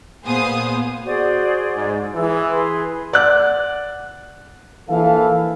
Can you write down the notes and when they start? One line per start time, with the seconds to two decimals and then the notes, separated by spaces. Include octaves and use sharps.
0.25 A#2 B3 G#4 C5 F5 D#6
1.06 F#4 G#4 C5 D5
1.76 G#2
2.15 E3 G#4 E6
2.51 G#4 B4 C6
3.13 D5 F#5 F#6
4.89 A#1 E3 A4 F5